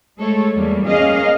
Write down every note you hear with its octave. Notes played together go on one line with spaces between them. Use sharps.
G#3 A3 A4 C#5
E2 G3 A#3
A#3 C#4 G#4 D#5 F5